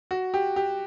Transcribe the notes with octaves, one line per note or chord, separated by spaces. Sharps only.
F#4
G4
G4